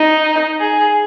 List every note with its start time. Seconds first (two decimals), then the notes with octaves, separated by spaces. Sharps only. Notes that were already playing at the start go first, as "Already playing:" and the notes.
Already playing: D#4
0.60 G#4